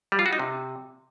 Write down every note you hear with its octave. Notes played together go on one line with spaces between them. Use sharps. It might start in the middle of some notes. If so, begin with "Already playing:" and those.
G3
F4
F#4
D#4
C3